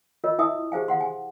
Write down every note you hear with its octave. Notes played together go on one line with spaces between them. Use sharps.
F4 A#4 C#5 D#5
E4 A#4 E5 G#5 D#6
G4 G#4 C5 F5 G#5
F5 F#5 C6
G#5 C6